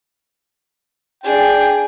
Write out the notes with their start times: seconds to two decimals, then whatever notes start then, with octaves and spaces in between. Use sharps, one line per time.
1.24 D4 G#4 G5